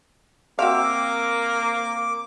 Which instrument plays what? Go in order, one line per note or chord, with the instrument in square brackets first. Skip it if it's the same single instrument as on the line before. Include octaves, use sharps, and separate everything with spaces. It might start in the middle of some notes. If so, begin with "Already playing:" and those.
[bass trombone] A#3 [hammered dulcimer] C4 [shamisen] F#4 E5 F5 [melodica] D6